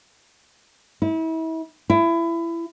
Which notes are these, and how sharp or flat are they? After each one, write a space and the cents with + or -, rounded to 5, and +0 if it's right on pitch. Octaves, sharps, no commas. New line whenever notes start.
E4 -35
E4 +25